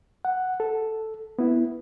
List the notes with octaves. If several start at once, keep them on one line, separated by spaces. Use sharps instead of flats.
F#5
A4
B3 E4